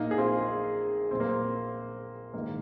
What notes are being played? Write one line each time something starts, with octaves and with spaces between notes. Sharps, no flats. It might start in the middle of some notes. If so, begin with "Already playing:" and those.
Already playing: A#1 A#2 A#3 D#4
G#4
C4 F4
A#1 A#2 C4
A#3
C4
A#1 G#2 D#3 A#3